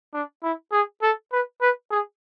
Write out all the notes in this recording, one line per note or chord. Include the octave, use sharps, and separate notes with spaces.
D4
E4
G#4
A4
B4
B4
G#4